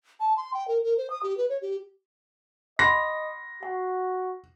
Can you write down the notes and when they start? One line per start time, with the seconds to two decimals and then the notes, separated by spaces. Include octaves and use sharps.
0.20 A5
0.37 C6
0.54 G5
0.68 A#4
0.84 A#4
0.98 C5
1.10 D#6
1.23 G4
1.37 B4
1.49 C#5
1.62 G4
2.79 D#5 F#5 B5 C6 A#6
3.63 F#4 F#5